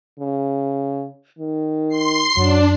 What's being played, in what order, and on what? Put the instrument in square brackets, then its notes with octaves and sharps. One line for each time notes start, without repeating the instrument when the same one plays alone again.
[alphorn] C#3
D#3
[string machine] C6 C7
[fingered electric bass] F#2 [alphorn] F#3 [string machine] D4